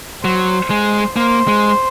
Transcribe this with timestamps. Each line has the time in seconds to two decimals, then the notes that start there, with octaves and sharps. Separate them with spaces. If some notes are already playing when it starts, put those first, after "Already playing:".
0.24 F#3 C5
0.70 G#3
1.16 A#3 C5
1.48 G#3